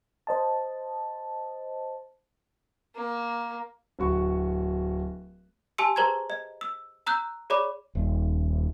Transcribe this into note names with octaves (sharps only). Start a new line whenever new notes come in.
C5 D#5 A5
A#3
D1 F#4 C#6
G4 G#5 A5 C6 E6 C#7
G#4 B4 C5 A#5 C6 G#6
D#5
E6
A#5 E6 F#6 G6
G#4 C#5 D5 B5 D6
D#1